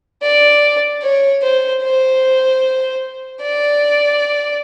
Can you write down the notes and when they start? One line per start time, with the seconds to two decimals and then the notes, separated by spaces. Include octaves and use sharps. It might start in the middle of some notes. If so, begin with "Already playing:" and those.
0.22 D5
1.02 C#5
1.42 C5
1.83 C5
3.42 D5